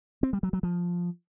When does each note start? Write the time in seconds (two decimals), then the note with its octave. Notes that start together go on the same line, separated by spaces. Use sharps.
0.23 C4
0.33 G3
0.43 F#3
0.53 F#3
0.63 F3